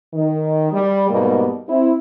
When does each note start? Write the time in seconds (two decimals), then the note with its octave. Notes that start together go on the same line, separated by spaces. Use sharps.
0.14 D#3
0.72 G3
1.09 G#2 B2 G3 A#3
1.69 C4 E4